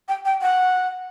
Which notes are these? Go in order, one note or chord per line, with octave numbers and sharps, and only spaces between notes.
G5
G5
F#5